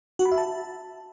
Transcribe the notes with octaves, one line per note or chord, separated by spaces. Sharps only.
F#4
B5
E5
A5